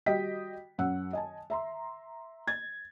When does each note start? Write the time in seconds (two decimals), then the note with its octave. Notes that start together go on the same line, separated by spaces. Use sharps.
0.06 G3 F#4 D#5 G5 B6
0.78 F#2 F#5 E6
1.13 D#5 G#5 A5
1.50 E5 A#5 C6
2.48 G#6 A6